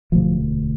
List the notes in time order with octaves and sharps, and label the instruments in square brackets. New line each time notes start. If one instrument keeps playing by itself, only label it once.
[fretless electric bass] E1 D2 C3 F3